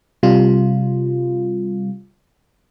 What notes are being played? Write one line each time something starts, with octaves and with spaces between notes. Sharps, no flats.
C3 G3 F4